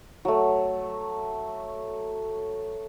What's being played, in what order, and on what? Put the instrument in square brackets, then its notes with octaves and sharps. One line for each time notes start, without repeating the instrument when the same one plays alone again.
[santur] F#3 A3